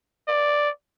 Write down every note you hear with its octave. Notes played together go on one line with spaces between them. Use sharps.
D5